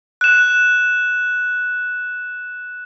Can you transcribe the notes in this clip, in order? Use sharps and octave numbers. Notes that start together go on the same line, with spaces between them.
F#6 E7